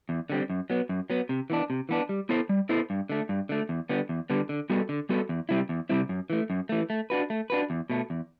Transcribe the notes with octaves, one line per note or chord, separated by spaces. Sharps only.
E2
D3 G3 C4
F#2
F#3 B3
F#2
F#3 B3
C3
E3 B3 D4
C3
E3 B3 D4
G3
B3 E4 A4 C5
G3
B3 E4 A4 C5
G2
D3 A3
G2
D3 A3
E2
D3 G3 B3
E2
D3 G3 B3
D3
G3 B3 F#4 A4
D3
G3 B3 F#4 A4
E2
C3 G3 C4 E4
E2
C3 G3 C4 E4
F#2
E3 A3
F#2
E3 A3
A3
D4 F#4 B4
A3
D4 F#4 B4
E2
B2 A3
E2